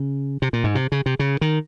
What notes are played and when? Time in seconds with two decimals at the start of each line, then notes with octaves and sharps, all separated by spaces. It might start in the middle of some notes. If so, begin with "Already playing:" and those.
Already playing: C#3
0.42 C3
0.53 A#2
0.64 G#2
0.75 C3
0.92 C#3
1.06 C3
1.19 C#3
1.41 D#3